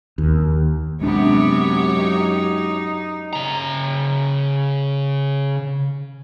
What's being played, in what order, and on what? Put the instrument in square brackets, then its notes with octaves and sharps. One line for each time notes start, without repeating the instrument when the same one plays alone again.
[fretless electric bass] D#2
[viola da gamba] F#2 G4 C#5 [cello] C3 B3 [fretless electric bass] G#3 D4
[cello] D#4
[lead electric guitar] C#3 A#5